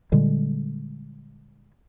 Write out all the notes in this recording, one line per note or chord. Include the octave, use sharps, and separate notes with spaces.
A#2 D3 G3 G#3